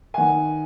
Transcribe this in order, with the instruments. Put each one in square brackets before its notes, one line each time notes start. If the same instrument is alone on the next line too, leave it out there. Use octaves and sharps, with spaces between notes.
[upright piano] D#3 F#5 G#5